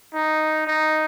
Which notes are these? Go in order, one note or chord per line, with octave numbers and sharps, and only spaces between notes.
D#4
D#4